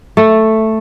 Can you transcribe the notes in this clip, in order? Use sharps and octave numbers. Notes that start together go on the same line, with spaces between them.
A3